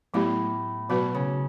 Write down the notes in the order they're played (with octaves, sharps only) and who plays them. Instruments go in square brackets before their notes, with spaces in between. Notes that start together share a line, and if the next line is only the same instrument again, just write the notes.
[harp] A2 [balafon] F#3 B3 E4 G4
[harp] B2 [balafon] F#3 B3 F#4 B4
[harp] C#3